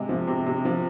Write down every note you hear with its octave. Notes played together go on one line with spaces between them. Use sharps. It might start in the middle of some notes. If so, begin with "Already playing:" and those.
Already playing: C3 G#3
F3
C3
C3
F3